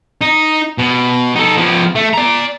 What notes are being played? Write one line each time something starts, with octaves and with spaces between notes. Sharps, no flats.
D#4
B2
D#4 A4
F3 B3
A3
D5 A#5